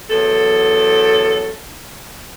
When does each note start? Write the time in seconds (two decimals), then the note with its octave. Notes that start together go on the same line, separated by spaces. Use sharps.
0.10 E2 F#3 A4